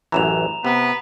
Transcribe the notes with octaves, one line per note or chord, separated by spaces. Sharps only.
A1 F#2 E3 A#5 E7 F7
C3 B3 B4